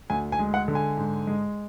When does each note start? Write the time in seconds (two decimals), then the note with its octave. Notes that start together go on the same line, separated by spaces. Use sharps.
0.10 D2 G#5
0.32 G#5
0.39 G#3
0.54 F#5
0.68 D3
0.75 G#5
0.97 G#2
1.27 G#3